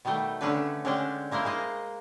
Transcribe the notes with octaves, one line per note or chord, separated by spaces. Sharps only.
B2 D#3 G3 A3 G5
D3 A3 C#4 D4 B4
D3 G#3 C#4 D4 G5
G#3 A#3 E4 A#4 C5
G#3 A#3 D#5